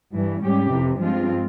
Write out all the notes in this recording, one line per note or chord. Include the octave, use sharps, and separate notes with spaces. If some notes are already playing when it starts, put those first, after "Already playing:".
G2 E3 G3
G#2 G3 C#4 G4
F2 C3 E3
G2 F3 G#3 C4 F4